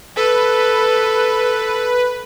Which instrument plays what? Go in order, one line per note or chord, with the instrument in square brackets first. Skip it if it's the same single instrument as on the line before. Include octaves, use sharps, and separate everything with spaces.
[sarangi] A4 [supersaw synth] B4